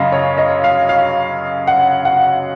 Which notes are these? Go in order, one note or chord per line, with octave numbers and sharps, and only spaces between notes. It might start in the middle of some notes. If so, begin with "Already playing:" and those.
Already playing: F#2 C#3 F#3 D#5 F5
C#5
D#5
F5
F5
F#5
F#5